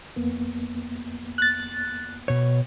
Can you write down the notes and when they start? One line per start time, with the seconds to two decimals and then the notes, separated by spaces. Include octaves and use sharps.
0.16 F2 A#3 B3
1.38 F#6 A6
2.28 B2 C#5